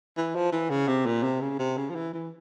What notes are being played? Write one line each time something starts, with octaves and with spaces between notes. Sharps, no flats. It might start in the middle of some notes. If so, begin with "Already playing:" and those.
E3
F3
E3
C#3
C3
A#2
C3
C#3
C3
C#3
F3
E3
E3